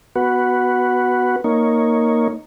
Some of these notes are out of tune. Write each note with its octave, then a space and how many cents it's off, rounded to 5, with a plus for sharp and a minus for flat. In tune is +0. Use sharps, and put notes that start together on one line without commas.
B3 +0 F#4 +0 B4 +0
A#3 +0 D#4 +0 C#5 +0